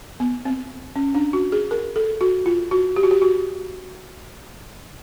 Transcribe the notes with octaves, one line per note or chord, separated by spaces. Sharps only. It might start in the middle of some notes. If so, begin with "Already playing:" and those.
B3
C4
C#4
D4
F#4
G#4
A#4
A4
F#4
F4
F#4
G4
F#4
G4
F#4